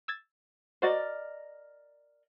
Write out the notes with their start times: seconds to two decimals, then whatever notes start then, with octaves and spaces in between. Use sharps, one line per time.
0.08 E6 G#6 A6
0.82 F#4 A#4 C5 D5 D#5